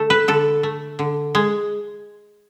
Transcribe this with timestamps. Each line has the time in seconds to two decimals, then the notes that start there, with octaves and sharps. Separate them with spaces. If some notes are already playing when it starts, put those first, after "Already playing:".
Already playing: D3 A3 A4
0.10 B4
0.28 D3 A4
0.63 A3
0.99 D3
1.35 G#3